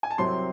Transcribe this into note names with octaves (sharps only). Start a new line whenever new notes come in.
G#5
A5
C2 C3 F#3 C4 C6